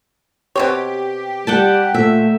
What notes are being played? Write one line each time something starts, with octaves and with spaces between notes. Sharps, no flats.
B2 C4 G4 C#5
G3 F#5 G5 A5
A#2 A3 E5